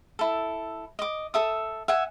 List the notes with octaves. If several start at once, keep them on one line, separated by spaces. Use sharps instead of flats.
E4 A4
D#5 D6
A4 E5 D#6
E5 F#5 G#5